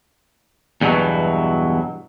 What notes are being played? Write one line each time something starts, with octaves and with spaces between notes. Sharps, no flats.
E2 G2 B2 E3 F#3